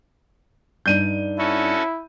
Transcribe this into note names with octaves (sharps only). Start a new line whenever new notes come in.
G2 D4 D#4 G6 D#7
C#4 E4 F#4 A4